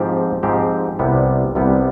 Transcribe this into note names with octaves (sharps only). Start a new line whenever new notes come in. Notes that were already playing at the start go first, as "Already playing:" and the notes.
Already playing: G#2 F3 C4 G4
G#2 F3 C4 G4
C2 C3 G3 B3
C2 C3 G3 B3